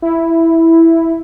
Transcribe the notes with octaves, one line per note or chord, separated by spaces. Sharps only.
E4